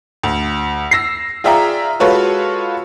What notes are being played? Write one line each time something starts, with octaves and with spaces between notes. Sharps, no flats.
D2
E6 A#6 C7
F4 G#4 D5 E5 G5 A#5
G#3 F4 F#4 A4 B4 C#5